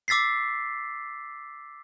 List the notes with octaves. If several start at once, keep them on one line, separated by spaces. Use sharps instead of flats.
D6 E6 A6 B6 C7